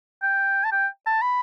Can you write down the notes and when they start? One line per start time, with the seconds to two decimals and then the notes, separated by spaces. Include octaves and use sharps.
0.23 G5
0.64 A5
0.72 G5
1.06 A5
1.22 B5